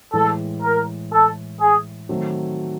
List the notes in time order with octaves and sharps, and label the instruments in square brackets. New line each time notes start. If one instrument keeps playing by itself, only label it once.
[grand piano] A2 E3 G#3 [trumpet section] A4
[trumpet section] A#4
A4
G#4
[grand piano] D#3 F#3 A3 C4